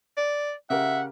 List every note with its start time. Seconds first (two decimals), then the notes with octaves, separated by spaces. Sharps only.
0.17 D5
0.70 C#3 G4 A#4 E5 F#5